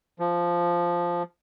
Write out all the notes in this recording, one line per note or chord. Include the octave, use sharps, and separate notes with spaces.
F3